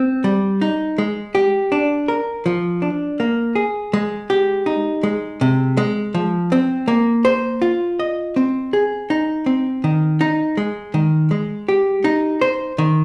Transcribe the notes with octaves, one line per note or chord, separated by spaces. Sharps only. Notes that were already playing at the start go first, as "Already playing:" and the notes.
Already playing: C4
G3
D#4
G#3
G4
D4
A#4
F3
D4
A#3
G#4
G#3
G4
D#4
G#3
C3
G#3
F3
C4
A#3
C5
F4
D#5
C4
G#4
D#4
C4
D#3
D#4
G#3
D#3
G#3
G4
D#4
C5
D#3